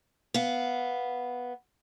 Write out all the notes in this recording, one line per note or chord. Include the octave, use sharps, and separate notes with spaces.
B3 F5